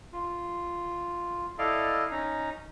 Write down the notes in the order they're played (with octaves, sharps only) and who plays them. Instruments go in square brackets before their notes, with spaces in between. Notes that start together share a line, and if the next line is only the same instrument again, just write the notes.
[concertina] F4
E4 A4 D5 D#5 F5
C#4 D#4 A#5